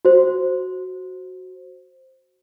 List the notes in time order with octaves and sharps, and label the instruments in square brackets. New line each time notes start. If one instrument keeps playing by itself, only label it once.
[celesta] F#4 C5